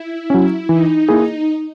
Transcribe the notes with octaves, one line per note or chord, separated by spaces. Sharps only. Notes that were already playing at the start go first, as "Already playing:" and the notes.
Already playing: E4
F#3 C#4
E3 D#4
A#3 E4 G#4